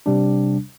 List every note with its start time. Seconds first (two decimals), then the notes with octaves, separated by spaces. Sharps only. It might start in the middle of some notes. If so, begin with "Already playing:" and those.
0.06 C3 G3 D4